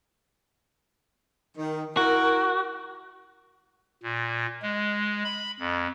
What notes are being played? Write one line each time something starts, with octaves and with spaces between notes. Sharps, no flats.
D#3
E4 F#4 A#4
A#2
G#3
B5
F2